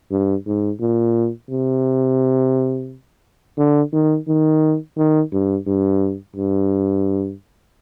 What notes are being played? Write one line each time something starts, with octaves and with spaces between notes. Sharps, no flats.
G2
G#2
A#2
C3
D3
D#3
D#3
D#3
G2
G2
G2